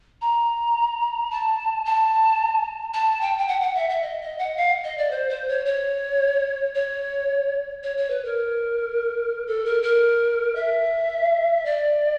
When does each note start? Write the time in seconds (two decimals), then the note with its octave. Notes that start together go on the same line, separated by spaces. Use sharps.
0.21 A#5
1.31 A5
1.85 A5
2.94 A5
3.21 G5
3.38 G5
3.48 F#5
3.61 F#5
3.75 E5
3.89 E5
4.02 D#5
4.21 D#5
4.39 F#5
4.57 F5
4.84 D#5
4.98 D5
5.11 C5
5.29 C5
5.48 C#5
5.66 C#5
6.74 C#5
7.83 C#5
7.97 C#5
8.10 B4
8.25 A#4
9.47 A4
9.65 A#4
9.83 A#4
10.55 E5
11.65 D5